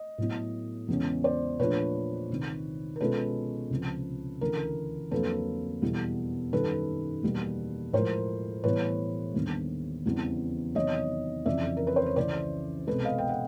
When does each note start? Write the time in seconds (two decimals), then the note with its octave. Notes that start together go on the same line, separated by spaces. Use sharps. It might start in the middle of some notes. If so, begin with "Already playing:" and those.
Already playing: D#5
0.18 A2 F#3 B3 E4
0.88 E2 C#3 E3 G#3 C#4
1.24 C5 D5
1.59 A#2 F3 A3 D4 F4 B4 C#5
2.30 C2 C3 D#3
2.96 A#4
3.00 B2 G#3 C#4 F4 A4 B4
3.71 C#2 C3 F3
4.41 D2 C#3 E3 A#4
5.11 F2 D3 F#3 A#3 A4 B4
5.82 E2 B2 G3 B3 E4
6.53 F#2 D#3 G3 A4 B4
7.23 E2 B2 G3 A#3
7.93 A2 F3 G#3 A#4 C5
8.63 A2 E3 G3 B3 B4 C#5
9.35 D#2 D3 G3 B3
10.06 E2 C#3 E3 G3 C4
10.75 E2 C3 D#3 F#3 C#5 D#5
11.46 F2 C#3 E3 D5 E5
11.77 A#4
11.87 B4
11.96 C5
12.06 C#5
12.16 C#2 C#3 E3 C5 D5
12.87 C2 B2 G#3 A4 B4
13.05 D#5 F5
13.18 G5
13.29 F#5